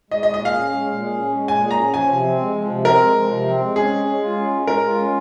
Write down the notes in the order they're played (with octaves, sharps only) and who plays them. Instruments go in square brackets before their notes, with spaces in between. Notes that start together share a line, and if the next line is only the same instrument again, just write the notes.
[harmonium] G#3 [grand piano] D#5
[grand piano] D#5
[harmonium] A#2
[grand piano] D#5
[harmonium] G#4 [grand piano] F5
[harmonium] C#4
G#3
A#2
G#4
C#4
G#3
[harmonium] A#2 [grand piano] G#5
[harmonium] G#4
[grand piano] A#5
[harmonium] C#4
[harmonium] F3 [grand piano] G#5
[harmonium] C3
C4
G#3
F3
C3
[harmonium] C4 [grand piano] A#4
[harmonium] G#3
F3
C3
C4
G#3
[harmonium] C#4 [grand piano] G#4
[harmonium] G#3
G#3
F4
C#4
G#3
[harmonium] G#3 [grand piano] A#4
[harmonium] F4
C#4